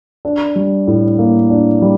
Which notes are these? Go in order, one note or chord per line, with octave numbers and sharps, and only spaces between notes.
D4
G3
A2
A#3
D4
G3